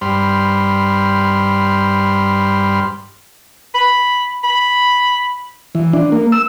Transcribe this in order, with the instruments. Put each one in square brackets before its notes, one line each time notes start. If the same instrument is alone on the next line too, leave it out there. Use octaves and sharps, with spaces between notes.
[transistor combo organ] G2 G3 C5 B5 C6 F6
[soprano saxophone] B5
B5
[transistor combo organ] E3
D4
A#3
E6